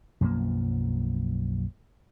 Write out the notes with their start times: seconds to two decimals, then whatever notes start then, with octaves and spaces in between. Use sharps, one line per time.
0.21 B1 F#2 F3 A#3